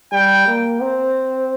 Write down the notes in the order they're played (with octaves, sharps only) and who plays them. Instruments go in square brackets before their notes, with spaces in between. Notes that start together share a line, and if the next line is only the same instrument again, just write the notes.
[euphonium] G3 [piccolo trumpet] G5
[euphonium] A#3
C4